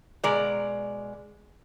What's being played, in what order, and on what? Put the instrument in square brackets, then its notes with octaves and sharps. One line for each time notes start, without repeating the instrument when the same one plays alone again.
[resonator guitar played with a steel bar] B2 G#3 D5 A#5